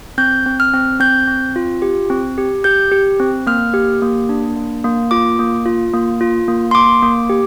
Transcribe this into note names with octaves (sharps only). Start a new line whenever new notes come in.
C4 G6
C4
F6
C4
C4 G6
C4
F4
G4
C4
G4
G4 G6
G4
C4
A#3 F6
G4
A#3
D4
A#3
A#3
F4 D6
A#3
F4
A#3
F4
A#3
C6
A#3 D6
A#3
G4